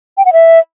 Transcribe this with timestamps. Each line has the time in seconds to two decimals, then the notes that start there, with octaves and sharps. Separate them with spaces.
0.18 G5
0.25 F#5
0.33 E5